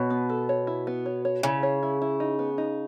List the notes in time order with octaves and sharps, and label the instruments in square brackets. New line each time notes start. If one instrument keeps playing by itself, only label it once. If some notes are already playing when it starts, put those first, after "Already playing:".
Already playing: [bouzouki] B2 [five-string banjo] C#5
[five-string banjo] B3
A4
C#5
E4
B3
C#5
C#5
[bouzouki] C#3 [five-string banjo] E4
[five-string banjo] C#5
E4
E4
D#4
B3
D#4